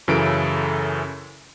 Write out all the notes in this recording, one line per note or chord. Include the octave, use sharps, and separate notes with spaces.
F#2 C#3 E3 E4 A4 D7